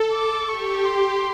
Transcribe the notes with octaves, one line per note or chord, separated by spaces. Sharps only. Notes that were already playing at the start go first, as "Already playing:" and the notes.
Already playing: A4
D6
G4 C#6
C6